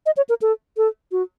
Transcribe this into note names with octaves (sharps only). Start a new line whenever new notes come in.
D#5
C#5
A#4
A4
A4
F#4